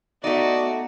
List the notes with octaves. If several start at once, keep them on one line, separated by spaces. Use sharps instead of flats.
A3 B3 D#4 F#4 D5